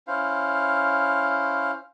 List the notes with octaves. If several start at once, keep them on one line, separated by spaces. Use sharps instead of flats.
C#4 E4 C5 F5